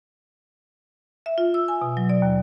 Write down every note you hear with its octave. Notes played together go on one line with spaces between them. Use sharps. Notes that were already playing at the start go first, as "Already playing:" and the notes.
E5
F4
E6
G#5
B2
F#3
D5
D#2